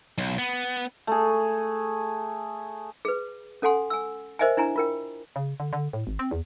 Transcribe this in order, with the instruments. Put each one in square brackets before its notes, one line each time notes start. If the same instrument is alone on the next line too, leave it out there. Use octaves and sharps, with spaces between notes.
[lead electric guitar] B1
B3
[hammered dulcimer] A3 G#4
[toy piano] G#4 B4
C#4 A4 F#5 G#5 C6
G#5 E6
A#4 C5 D#5 E5 G5 G#5
D4 E4 G#5 A#5
F4 A#4 G5
[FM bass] C#3
D3
D3
A2
G#1
C4
E2